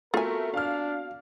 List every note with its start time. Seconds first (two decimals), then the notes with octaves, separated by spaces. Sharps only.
0.14 A3 B3 C4 F4 F#4 A#4 G#5
0.54 D4 F5 F6